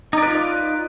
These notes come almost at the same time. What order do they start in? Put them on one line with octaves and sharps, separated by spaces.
D#4 D5 B4 F4